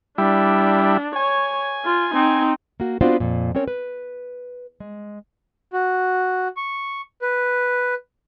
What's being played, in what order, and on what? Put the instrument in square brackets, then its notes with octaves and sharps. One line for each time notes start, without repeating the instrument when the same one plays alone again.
[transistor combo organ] G3 E4 [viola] D4
[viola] C#5 [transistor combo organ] G#5
[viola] F4
C4 D#4
[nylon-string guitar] A#3 F#4
B3 C4 D4 F4 F#4 C5
F2 A#2
C4 C#4 A#4 C#5
B4
G#3
[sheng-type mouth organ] F#4
C#6
B4